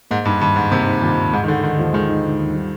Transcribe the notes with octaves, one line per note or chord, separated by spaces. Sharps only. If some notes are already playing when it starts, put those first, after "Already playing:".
G#2 A#3
G2 D#4
G2 D#3
D#2 G#2
C3 A#3
D#4
A#2 D#3
D#2
G#2 G#3
D#3
D3 D#4
D3 D#3
D#2 F3
D#3 G#3
D#4
D3
D#2
G3